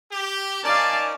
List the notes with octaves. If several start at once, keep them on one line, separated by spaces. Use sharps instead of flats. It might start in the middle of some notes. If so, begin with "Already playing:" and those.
G4
C#4 D#4 A#4 D5 F5 G#5 A5